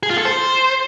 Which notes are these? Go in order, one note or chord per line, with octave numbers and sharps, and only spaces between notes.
G#4
F4
A4
C5